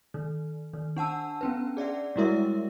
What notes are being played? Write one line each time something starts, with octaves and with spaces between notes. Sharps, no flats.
D#3
D#3
D4 F#5 A5 E6
B3 C#4 B4
G#4 D5 E5 F#5
G3 G#3 E4 F#4 A#4 E5